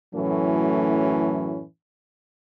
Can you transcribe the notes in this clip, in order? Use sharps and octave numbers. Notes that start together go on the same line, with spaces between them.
F#2 A2 E3 F#3 A3 C#4